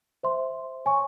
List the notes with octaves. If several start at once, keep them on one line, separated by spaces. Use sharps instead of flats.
C5 E5 C6
C#5 G#5 C#6